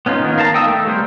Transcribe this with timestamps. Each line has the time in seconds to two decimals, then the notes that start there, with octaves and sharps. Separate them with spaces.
0.06 B3 C#4 D#4 F4
0.23 D#3 A#3 B3
0.38 A#4 F5 A5 A#5
0.54 D#4 G5 A#5 D#6 E6
0.65 A3
0.87 G3 B3 G#4 A#4 C5